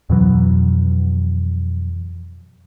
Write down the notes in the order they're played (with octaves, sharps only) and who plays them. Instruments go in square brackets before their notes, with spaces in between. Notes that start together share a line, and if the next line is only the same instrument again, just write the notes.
[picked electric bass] F2 B2 E3 F#3